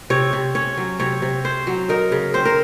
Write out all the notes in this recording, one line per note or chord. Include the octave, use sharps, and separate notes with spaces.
C3 C#5
C3
C#4 C#5
F#3
C3 C#5
C3
C#4 C5
F#3
D#4 A#4
C#3
C4 C5
A#4